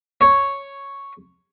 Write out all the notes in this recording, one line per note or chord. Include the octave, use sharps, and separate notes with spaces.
C#5